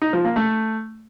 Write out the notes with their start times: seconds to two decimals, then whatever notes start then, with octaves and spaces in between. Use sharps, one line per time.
0.02 D#4
0.13 F3
0.25 A#3
0.36 A3